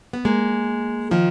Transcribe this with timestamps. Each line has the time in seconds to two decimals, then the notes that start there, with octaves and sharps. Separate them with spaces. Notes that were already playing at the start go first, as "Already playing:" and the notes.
0.13 B3
0.25 G#3 A#3
1.11 D#3 F3